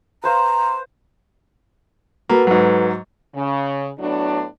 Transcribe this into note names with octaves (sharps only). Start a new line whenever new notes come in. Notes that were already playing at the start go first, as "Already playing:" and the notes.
B4 C5 F5 A#5
A#3 F#4 A4 B4
G#2 F#3
C#3
A2 F#3 B3 D4